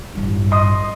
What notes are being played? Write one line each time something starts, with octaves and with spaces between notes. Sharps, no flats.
A1 G2
D#5 C6 D#6